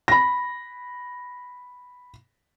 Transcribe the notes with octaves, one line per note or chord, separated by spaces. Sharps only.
B5 A#6